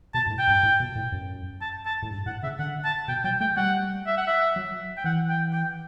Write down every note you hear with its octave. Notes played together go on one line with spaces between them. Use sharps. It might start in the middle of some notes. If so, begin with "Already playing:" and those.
B2 A5
G2
A2
G5
G2
A2
B2
A2
F#2
A5
A5
A2
G2
A2 F#5
C#3 E5
D3 F#5
A5
B2 G5
F#3 G5
A3 G5
G3 F#5
E5
F#5
E5
F#3
G5
E3 F#5
G5
G5